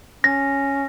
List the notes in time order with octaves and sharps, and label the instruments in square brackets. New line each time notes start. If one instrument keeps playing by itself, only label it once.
[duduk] C#4 [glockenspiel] A#6